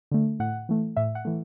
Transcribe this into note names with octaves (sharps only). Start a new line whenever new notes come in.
D3 A3
A2 F#5
E3 A3
A2 E5
F#5
E3 A3